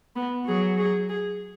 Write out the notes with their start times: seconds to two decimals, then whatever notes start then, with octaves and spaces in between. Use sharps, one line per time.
0.16 B3
0.47 F#3 G#4
0.78 G#4
1.09 G#4